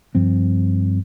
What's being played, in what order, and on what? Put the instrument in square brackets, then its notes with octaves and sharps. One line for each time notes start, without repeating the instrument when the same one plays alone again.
[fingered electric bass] G2 F3 C4